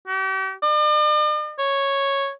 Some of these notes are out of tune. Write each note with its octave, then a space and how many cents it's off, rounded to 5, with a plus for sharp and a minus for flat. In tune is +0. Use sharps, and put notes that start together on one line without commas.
G4 -45
D5 +45
C#5 -5